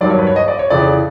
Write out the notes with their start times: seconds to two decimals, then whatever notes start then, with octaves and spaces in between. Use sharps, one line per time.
0.01 G2 D#3 F#3 D5
0.10 C#5
0.19 B4
0.27 C#5
0.36 D#5
0.48 D5
0.59 C#5
0.70 F2 C#3 E3 D5